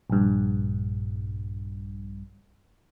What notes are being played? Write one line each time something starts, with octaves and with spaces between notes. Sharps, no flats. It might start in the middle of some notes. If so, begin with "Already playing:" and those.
A#1 G2